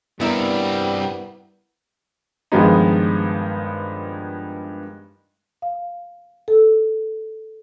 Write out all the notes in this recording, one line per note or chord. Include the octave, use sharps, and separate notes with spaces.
G2 G3 B3 C4 E4 A#4
G2 D#3 F3 G#3 B3 D#4
F5
A4